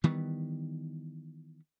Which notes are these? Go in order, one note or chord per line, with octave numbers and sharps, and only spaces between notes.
D#3 E3 G3 B3